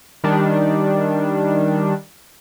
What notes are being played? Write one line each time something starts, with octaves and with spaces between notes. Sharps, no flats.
D#3 G3 D4